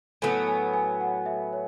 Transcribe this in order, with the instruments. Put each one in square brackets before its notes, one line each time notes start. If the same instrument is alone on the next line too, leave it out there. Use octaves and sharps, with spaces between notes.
[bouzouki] A2 F#3 B3 [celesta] G#5
[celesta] G#5
G#5
F#5
E5
C#5